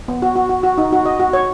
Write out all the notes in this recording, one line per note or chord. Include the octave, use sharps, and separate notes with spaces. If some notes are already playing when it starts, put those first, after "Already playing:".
B3
F#4
F#4
F#4
F#4
D#4
F#4
D#5
F#4
C#5